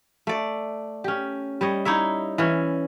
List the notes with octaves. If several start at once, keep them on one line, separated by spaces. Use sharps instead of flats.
A3 D5
C#4 G4
G3 C#5 D#5
D#4 E4 C#5 E5
E3 C#4